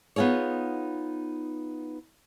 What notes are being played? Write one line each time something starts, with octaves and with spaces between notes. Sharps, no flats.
B3 D#4 F4 G#4 C#5